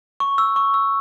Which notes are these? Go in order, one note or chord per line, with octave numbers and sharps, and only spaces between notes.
C#6
E6
C#6
E6